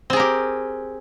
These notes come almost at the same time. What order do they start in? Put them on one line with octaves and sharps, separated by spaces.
C4 G#4 A#4 G4